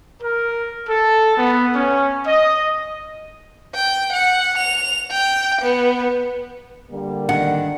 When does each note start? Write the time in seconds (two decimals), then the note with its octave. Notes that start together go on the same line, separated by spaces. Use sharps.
0.22 A#4
0.88 A4
1.37 B3
1.75 C#4
2.27 D#5
3.75 G5
4.13 F#5
4.58 F7
5.12 G5
5.62 B3
6.91 D3 G3 A#3
7.29 D#3 D4 F#5